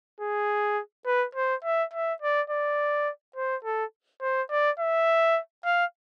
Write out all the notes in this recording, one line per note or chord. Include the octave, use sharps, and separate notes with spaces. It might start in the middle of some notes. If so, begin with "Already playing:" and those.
G#4
B4
C5
E5
E5
D5
D5
C5
A4
C5
D5
E5
F5